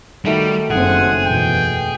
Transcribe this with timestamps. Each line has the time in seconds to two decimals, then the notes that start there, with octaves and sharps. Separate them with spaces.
0.25 D#3 G3 A3 F#4
0.71 F#1 F#2 C4 G#4 F#5
1.25 E2 B2 G5